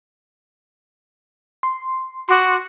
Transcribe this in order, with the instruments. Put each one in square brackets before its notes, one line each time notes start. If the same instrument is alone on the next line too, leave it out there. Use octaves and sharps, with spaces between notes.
[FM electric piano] C6
[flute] F#4 [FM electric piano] C6 D6